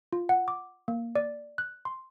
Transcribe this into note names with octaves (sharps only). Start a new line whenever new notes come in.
F4
F#5
D6
A#3
D5
F#6
C6